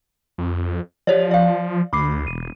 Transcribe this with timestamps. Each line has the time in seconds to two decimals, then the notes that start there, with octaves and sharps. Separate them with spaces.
0.38 F2
1.07 F3 G4 C#5 D5
1.31 D5 F5
1.93 D2 B5 D6 C7
2.27 E1 D#7